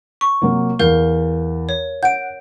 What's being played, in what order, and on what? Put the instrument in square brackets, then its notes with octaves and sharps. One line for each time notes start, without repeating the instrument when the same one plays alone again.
[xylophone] C#6
[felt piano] C3 F#3 A#3
[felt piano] E2 [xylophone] A#4 F5 G6
[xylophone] C#5
[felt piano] F#5 [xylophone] G6 D7